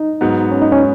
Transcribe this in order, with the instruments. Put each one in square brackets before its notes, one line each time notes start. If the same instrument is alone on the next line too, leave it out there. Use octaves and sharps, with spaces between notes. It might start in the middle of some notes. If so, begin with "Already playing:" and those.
Already playing: [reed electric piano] D#4
[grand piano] G#2 F#3 B3
[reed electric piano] C#4
D#4
C#4